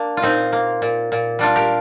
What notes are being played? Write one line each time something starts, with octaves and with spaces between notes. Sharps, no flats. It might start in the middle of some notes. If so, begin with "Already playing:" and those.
Already playing: A#3 D4
F4
A#2 C4 D#4
A#3
A#2
A#2
G3 D4 F4
G4 A#4